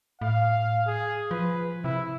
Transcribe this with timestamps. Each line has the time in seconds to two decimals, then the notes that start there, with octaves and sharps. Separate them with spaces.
0.21 A2 F5
0.87 G#4
1.31 F3 B4
1.84 C3 E4